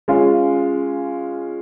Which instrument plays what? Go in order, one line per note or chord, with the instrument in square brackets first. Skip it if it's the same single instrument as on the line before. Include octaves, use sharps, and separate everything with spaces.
[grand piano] G#3 C#4 F4